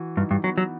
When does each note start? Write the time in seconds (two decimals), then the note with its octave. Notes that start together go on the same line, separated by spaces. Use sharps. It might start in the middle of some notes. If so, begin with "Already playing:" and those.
Already playing: E3 F#4
0.17 G2 D#4
0.31 G2
0.44 F#3 B3
0.58 F#3